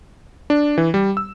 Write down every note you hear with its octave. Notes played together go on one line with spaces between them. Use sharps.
D4
E3
G3
E6